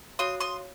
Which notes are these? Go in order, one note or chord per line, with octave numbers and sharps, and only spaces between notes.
F#4 C#5 F5 C6 D#6
C6 D#6